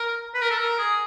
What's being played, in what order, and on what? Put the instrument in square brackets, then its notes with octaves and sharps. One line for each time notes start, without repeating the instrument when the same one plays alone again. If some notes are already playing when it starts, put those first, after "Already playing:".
Already playing: [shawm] A#4
B4
A#4
A4
A#4
G#4